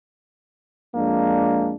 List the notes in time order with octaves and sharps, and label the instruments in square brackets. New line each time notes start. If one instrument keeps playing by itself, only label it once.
[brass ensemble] F2 G#3 A#3 D4